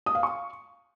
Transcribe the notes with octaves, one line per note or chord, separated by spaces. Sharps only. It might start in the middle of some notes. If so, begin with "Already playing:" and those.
D#6
F5
C#6